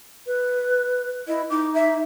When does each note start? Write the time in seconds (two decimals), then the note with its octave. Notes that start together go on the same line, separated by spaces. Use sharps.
0.27 B4
1.28 E4 D#5
1.50 D#4 D6
1.74 E5